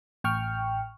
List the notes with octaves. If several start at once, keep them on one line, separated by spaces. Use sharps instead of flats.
A1 G5 C#6 F6